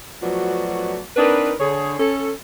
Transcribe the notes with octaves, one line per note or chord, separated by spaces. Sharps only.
F3 F#3 A3 B3 F#4 D5
C4 D4 D#4 A#4 B4
D3 G#4 C#5
C#4 A4